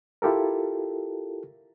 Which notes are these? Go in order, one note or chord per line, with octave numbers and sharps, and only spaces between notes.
E4 F4 G4 A4 A#4